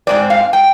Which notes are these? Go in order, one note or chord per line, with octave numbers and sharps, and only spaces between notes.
G#2 D#3 G#3 C4 D5
F5
G5